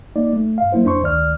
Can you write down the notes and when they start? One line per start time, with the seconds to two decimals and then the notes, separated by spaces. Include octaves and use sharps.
0.16 A#3 D#4 D5
0.33 A3
0.58 G2 F5
0.72 F#3 A#3 E4 C5
0.85 F2 D4 C5 C6 C#6
1.02 D2 D#3 D5 F6